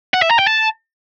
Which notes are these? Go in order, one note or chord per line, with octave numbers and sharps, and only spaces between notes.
F#5
E5
A#5
G5
A5